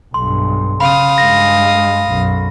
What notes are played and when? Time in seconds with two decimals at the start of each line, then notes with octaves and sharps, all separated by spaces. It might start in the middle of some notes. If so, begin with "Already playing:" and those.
0.14 B1 G2 C6
0.80 C#3 F5 B5 D#6
1.18 G2 G#3 A#6
2.07 B1 F#2